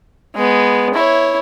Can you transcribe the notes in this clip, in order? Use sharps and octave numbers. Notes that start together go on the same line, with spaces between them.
G#3 B3
E4 C#5